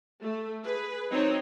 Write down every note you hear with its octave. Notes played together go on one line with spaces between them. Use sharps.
A3
G#4 B4
F#3 C4 D#4 C#5